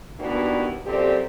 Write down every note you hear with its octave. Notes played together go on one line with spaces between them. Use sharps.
D#2 E3 B3 D4 F#4 D5
F#2 A#2 C4 G4 A4 D5